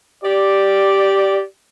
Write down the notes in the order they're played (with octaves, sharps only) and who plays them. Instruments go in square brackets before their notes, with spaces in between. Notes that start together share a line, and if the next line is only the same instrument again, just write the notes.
[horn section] G4 D5